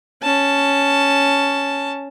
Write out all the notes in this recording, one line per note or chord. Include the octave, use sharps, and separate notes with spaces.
C#4 A5